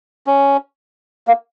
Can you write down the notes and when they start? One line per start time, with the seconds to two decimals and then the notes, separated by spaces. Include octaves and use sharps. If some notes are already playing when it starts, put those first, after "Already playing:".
0.27 C#4
1.27 A#3